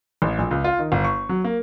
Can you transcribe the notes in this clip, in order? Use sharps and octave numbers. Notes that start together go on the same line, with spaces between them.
A1
A#1
C#2
F4
D#3
G1
C#6
F#3
A#3